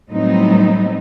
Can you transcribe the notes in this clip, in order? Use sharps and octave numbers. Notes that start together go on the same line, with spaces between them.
A2 F#3 G3 B3 C4 D#4